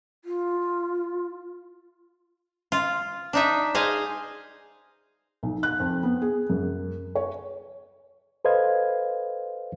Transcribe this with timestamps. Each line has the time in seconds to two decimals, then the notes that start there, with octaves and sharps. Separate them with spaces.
0.25 F4
2.72 F4
3.33 D4 D#4 E5
3.75 G#4 C5 D#5 F5
5.43 B1
5.63 F#6
5.80 F2
6.03 B3
6.22 G#4
6.50 F#2
7.15 C#5
8.45 A4 B4 C5 D#5 F5 G#6